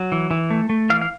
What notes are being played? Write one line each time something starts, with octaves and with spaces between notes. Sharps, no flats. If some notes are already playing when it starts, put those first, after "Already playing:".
Already playing: F#3
E3
E3
A3
A3
E3 F5
F5